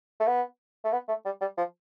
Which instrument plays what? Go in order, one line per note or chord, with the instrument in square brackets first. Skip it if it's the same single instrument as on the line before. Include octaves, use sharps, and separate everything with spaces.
[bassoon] A3
B3
A3
B3
A3
G3
G3
F3